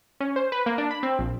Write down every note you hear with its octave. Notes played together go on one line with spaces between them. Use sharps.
C#4
C5
B4
A#3
D4
B5
C4
A#1